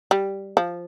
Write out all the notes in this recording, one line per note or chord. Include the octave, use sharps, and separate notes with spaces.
G3
F3